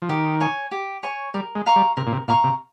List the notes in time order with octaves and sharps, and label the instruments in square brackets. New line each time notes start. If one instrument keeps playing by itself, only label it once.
[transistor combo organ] F3
[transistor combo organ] D#3 [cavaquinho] G4
[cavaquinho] C#5 G#5 C#6
G4
C#5 G#5 C#6
[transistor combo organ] G3 [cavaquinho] A#4
[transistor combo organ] G#3
[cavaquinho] F5 A#5 C#6
[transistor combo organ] G3
[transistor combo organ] C3 [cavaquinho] A#4
[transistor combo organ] A#2
C3
[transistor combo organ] A#2 [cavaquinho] F5 A#5 C#6
[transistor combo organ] C3